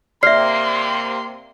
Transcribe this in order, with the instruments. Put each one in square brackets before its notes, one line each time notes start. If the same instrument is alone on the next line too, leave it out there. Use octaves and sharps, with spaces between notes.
[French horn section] C3 A#3 [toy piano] D5 E5 [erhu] C6 [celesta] F6 C7